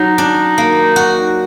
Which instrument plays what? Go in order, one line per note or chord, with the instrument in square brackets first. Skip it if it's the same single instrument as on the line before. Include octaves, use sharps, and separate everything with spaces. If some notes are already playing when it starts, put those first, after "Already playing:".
Already playing: [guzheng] F#3 [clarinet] D#4
[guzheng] D4
A#3
F#4